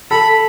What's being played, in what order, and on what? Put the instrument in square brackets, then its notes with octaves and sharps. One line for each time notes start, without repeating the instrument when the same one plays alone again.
[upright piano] A4 [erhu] B5